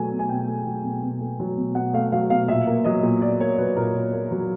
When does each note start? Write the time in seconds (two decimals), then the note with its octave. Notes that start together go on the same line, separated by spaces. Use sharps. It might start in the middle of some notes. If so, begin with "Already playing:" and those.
Already playing: B2 F#3 A3 G#5
0.12 B2
0.19 G#5
0.29 B2 G5
0.48 A3
0.66 F#3
0.84 B2
1.03 B2
1.21 A3
1.40 F#3
1.57 B2
1.75 B2 F#5
1.93 A3 F5
2.12 F#3 F5
2.30 B2 F5
2.48 A#2 E5
2.67 A#3
2.84 F#3 D#5
3.03 A#2
3.22 A#2 D5
3.40 A#3 C#5
3.58 F#3 B4
3.76 A#2 A#4
3.94 A#2
4.13 A#3
4.31 F#3